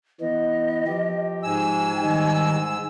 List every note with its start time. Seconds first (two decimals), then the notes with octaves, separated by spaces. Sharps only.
0.21 E3 B3 D#5
0.87 F3 G4
1.43 G#2 G#5 E6
2.03 D#3 G3 D#4